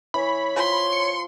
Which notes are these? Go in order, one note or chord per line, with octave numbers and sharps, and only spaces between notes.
E3 C#5 B5
F3 C6
C#7